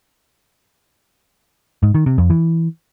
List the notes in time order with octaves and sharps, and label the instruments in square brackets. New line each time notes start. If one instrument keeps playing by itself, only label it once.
[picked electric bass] G#2
D#3
C3
F2
E3